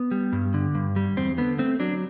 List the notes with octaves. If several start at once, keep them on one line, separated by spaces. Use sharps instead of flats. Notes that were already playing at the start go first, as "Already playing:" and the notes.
Already playing: B3
G3
G2
D3
G2
G3
E2 C4
D3 B3
A3 C4
F#3 D4